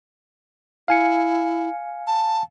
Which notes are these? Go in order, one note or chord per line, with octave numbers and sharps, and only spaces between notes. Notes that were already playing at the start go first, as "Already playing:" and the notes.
E4 F5 G#5 C#7
A5